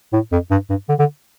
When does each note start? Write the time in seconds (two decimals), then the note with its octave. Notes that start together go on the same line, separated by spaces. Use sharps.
0.13 A2
0.32 F2
0.51 G2
0.70 G2
0.89 D3
0.99 D3